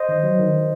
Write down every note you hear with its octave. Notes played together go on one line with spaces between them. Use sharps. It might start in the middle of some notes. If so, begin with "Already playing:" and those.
Already playing: C5 D#5
D#3
F#3
D#3
D#3